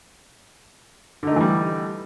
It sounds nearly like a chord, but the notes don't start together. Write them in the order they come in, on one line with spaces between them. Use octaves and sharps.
D3 D#4 A3 E3 G3